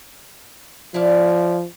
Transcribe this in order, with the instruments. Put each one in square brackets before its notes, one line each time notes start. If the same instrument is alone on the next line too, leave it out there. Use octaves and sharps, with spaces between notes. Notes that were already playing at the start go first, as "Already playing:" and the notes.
[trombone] F3 [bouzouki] E4 D5 F5